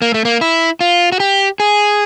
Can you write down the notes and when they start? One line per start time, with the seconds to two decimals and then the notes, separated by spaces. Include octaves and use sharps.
0.02 A#3
0.14 A3
0.25 A#3
0.41 E4
0.81 F4
1.12 F#4
1.20 G4
1.60 G#4